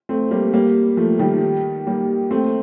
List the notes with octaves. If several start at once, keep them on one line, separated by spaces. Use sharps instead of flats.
A3 C4
G3 A#3
G3 A#3
F3 A3
D#3 G3
G3 A#3
A3 C4